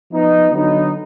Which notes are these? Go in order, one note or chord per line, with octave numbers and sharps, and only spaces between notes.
F3 B3 D#4
D3 F#3 B3 D#4